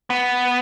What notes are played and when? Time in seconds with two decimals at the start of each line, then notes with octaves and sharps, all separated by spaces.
0.10 B3